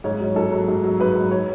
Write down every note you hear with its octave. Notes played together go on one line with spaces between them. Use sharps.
G#2 C#5
F#3
G#2 A4
F#3
G#2
F#3
G#2 B4
F#3
C#5